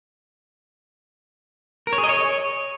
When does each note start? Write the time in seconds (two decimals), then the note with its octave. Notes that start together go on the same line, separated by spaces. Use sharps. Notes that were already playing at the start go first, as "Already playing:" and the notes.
1.87 A#4
1.93 C#5
1.98 G#4
2.04 D#5
2.09 C#5